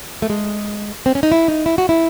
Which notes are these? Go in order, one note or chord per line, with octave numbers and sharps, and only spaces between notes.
A3
G#3
C4
C#4
D#4
E4
D#4
E4
F#4
E4